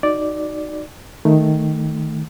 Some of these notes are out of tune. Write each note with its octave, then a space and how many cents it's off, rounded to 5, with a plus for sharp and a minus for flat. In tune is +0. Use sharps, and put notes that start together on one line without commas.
D#4 -5 F#4 +0 D5 +0
D#3 +0 A3 +0